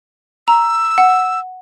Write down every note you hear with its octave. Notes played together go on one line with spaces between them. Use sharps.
A#5 E6
F#5